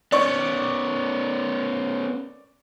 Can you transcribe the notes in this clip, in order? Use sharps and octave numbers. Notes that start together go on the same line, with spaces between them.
B3 C#4 D5 C#6 D6